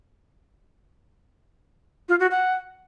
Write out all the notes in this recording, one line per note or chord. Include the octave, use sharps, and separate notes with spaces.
F4
F#4
F#5